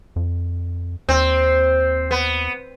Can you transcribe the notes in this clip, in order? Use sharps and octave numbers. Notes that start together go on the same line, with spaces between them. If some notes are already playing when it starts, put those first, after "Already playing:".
F2
D#2 C4
B3